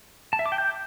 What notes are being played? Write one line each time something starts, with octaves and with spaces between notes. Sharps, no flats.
A5
E5
D6
G5
G6